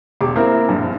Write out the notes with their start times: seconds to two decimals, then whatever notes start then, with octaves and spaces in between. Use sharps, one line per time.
0.21 E1 G4 D6
0.36 A#3 C4 E4 A#4
0.69 A#1 G2